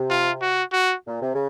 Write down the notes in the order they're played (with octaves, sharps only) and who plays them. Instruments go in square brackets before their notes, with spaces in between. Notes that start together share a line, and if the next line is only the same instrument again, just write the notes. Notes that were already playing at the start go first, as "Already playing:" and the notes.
Already playing: [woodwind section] C3
[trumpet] F4
F#4
F#4
[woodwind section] A#2
C3
C#3